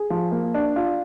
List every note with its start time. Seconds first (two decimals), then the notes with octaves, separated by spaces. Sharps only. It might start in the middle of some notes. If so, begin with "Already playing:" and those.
Already playing: G#4
0.10 F3
0.32 A#3
0.54 D4
0.76 F4